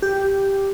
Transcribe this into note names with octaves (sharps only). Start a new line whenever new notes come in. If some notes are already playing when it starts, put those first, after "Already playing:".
G4